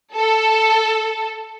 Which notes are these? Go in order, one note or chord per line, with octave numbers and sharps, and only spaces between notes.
A4